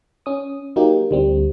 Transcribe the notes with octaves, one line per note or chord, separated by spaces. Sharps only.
C#4 D#6
F#3 A#3 D#4 G4
D2 G3 C4